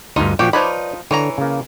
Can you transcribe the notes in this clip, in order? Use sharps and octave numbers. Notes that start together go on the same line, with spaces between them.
D2 G2 D#4 F4
A#2 F3 F#4 G4 G5
F3 D#4 B4 C#5 D5 B5
D3 E3 C#5 A#5
C#3 A#3